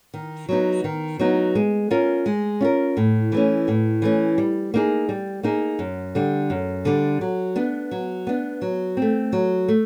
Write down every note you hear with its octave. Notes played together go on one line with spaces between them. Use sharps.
D#3
F#3 B3 D#4
D#3
F#3 B3 D#4
G#3
C#4 F4 A#4
G#3
C#4 F4 A#4
A2
E3 A3 C#4
A2
E3 A3 C#4
G3
A#3 D#4 G#4
G3
A#3 D#4 G#4
F#2
D3 G3
F#2
D3 G3
F#3
B3 D4
F#3
B3 D4
F#3
A3 C4
F#3
A3